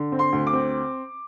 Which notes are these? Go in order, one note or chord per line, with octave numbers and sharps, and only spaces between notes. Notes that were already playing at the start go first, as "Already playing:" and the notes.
Already playing: D3
C4
C6
D2
D6
C4